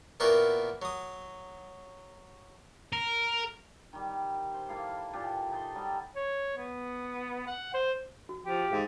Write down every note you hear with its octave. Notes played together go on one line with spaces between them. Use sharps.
A#2 A#3 B3 E4 F#4 G5
F#3 D#6
A#4
D#3 G3
C5
A#3 E4 A4 F5
A#2 E3 G4 A4
D#4 A4 A5 C6
F#3 G3 D#5
C#5
B3
F#5
C5
F#4
F3 G4
G#2 G#4 F5